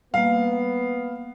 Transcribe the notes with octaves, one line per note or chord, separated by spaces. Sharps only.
G3 A#3 B3 F5